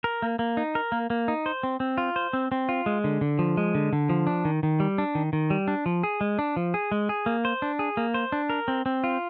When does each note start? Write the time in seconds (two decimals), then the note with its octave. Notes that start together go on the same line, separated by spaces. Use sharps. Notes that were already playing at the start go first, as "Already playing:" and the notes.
0.04 A#4
0.22 A#3
0.39 A#3
0.57 D#4
0.75 A#4
0.92 A#3
1.10 A#3
1.28 D#4
1.46 C5
1.63 C4
1.80 C4
1.98 F4
2.16 C5
2.33 C4
2.52 C4
2.69 F4
2.86 G#3
3.04 D3
3.21 D3
3.39 F3
3.57 G#3
3.75 D3
3.93 D3
4.09 F3
4.27 D4
4.45 D#3
4.63 D#3
4.80 G3
4.98 D4
5.15 D#3
5.33 D#3
5.50 G3
5.68 D4
5.86 F3
6.03 G#4
6.21 G#3
6.39 D4
6.56 F3
6.74 G#4
6.92 G#3
7.09 G#4
7.26 A#3
7.45 C5
7.62 D4
7.79 G#4
7.97 A#3
8.14 C5
8.32 D4
8.50 A#4
8.68 C4
8.86 C4
9.04 F4